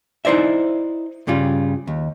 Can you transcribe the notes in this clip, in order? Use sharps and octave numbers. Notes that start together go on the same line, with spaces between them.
D#4 E4 C5 D5 E5
G2 C#3 G3 F4
D#2